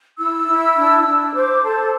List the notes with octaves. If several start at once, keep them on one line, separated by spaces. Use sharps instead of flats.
E4 E6
E4
D4
D4
C5 D6
A4 A5